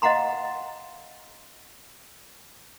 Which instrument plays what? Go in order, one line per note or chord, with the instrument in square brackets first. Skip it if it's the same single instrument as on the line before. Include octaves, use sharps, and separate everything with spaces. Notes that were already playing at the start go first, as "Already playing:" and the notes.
[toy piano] D#5 F5 F#5 A#5 C6